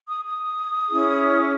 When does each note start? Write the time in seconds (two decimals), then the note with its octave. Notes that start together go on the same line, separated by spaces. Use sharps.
0.08 D#6
0.24 D#6
0.88 C#4 E4 G#4
1.35 D6